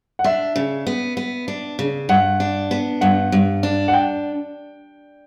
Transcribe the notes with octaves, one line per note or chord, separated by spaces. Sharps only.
F#5
D4 E5
C#3
B3
B3
D4
C#3
G2 F#5
D4
B3
G2 F#5
G2
D4
F#5
G5